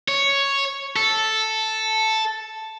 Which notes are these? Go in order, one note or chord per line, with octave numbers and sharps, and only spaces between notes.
C#5
A4